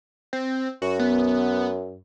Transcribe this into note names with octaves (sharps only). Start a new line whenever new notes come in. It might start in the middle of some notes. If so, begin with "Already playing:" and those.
C4
F#2 F#4
B3